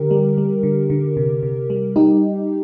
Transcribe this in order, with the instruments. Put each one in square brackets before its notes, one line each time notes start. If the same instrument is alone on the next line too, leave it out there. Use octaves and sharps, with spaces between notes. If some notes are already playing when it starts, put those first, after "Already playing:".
Already playing: [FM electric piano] D3 G4 A#4
G3
G3
D3
D3
C3
C3
G3
G3 D#4 G4